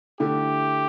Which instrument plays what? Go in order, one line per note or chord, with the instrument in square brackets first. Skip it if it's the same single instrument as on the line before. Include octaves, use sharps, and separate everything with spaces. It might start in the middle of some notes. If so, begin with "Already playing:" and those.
[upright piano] D3 A3 E4 [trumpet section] G4